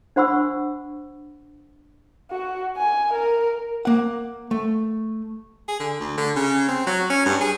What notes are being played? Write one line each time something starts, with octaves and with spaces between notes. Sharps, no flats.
D4 C5 F#5 B5 C#6 E6
F#4
G#5
A#4
A#3 F#5
A3
G#4
D3
D2
D3
C#3
C4
F#3
C#4
G2
G#4